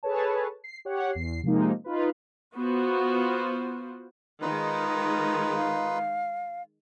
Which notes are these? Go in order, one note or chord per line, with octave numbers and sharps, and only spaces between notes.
G#4 A4 B4 C#5 A5
C7
G4 C#5 F#5
E2 C7
C3 F3 G#3 A#3 D#4
D#4 F4 B4
B3 F4 F#4 C5
D#3 G#3 D#4 F4 B4
F5